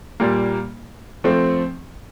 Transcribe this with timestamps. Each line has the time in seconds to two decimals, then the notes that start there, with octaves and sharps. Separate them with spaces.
0.20 A#2 G3 A#3
1.24 F3 A3 C4